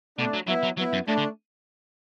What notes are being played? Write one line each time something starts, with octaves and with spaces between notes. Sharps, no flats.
B2 A3 D4
F#3
F#3 B3 E4
F#3
F#3 B3 E4
F#2
A2 A3 D4
D3